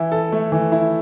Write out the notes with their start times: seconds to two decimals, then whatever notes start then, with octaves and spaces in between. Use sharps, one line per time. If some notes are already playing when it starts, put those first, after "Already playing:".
Already playing: E3 E4
0.12 A4
0.32 A3
0.52 E3
0.72 E4